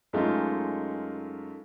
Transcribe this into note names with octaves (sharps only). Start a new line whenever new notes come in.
F#2 G#3 A3 D#4 F4